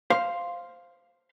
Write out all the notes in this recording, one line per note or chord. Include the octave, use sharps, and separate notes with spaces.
C5 F5 C6